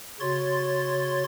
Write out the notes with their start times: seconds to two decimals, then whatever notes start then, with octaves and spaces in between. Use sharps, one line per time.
0.20 C#3 F#4 C#5 C6 A6